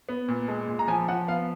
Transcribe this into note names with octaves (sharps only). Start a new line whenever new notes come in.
B3
A#2
G#3
A#2
A#5
F3 G#5
F3 F#5
B3 F5